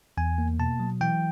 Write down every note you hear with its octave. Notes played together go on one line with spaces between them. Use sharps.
E2 G#5
A#3
B2 A5
F#3
E3 G5